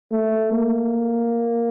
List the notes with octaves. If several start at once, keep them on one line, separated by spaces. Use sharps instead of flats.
A3
A#3